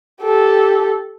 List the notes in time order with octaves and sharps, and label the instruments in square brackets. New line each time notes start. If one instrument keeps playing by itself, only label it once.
[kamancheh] G4 A4